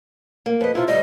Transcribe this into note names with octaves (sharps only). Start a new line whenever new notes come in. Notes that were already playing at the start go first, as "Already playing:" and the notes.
A#3
F2 B4 D#5
C3 E4 F4
D2 G3 C5 D#5